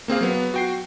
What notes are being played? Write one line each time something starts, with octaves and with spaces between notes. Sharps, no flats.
A#3 C4 G#4 F5
F#3 B3
F#4 G5 C7